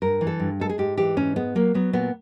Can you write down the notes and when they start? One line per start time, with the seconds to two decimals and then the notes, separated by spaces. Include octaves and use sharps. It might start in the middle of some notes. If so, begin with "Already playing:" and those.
0.02 G2 A#4
0.21 E3
0.27 A4
0.40 G2
0.60 G#3 A4
0.69 G#4
0.78 G#2 G4
0.98 E3 G4
1.17 G#2 C#4
1.36 G#3 B3
1.55 F#3 A#3
1.74 F#3 B3
1.93 A#2 B3